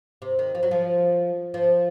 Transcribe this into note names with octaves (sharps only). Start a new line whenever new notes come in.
C3
D#3
F3
F#3
F3
F3